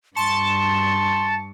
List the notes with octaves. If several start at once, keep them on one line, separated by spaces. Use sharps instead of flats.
G2 A5 C6 C#6